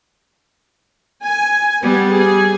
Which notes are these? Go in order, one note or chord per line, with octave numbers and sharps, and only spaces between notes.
G#5
G3 B3
G#4 G#5